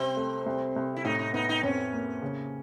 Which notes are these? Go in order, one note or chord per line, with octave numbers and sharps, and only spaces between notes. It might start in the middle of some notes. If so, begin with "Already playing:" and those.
Already playing: C2 C4
A3
C2
C2
E4
A2 D#4
D#4
B3 D#4
D#4
F2 C#4
A#3
C#3